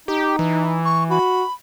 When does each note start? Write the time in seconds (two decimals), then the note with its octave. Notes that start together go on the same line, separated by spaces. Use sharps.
0.08 D#4 G4
0.39 E3
0.85 C#6
1.10 F#4 B5